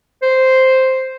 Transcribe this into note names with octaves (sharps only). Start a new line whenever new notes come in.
C5